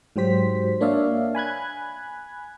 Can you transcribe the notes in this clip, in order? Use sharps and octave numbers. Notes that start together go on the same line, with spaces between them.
G#2 F#3 G4 C5 B6
A#3 D4 C#5 D5 E5 F5
G#5 B5 F#6 G#6